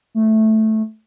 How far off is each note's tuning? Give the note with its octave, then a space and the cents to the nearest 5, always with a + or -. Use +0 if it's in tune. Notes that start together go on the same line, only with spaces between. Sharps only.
A3 -5